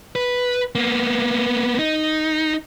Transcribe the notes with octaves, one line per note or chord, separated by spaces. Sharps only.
B4
A#3 B3
D#4